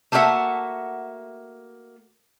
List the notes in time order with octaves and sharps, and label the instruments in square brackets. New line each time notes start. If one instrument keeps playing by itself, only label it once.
[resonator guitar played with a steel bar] A3 A#3 F#4 G#4 E5 F#5